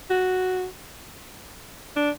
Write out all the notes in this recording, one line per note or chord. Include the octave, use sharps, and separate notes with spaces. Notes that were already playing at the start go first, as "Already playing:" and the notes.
F#4
D4